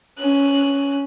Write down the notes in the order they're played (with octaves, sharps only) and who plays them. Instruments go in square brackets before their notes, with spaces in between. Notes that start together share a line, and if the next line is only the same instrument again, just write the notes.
[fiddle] C#4 F#6